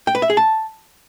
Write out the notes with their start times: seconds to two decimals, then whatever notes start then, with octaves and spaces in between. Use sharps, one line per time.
0.07 G5
0.15 B4
0.22 E5
0.30 G#4
0.37 A5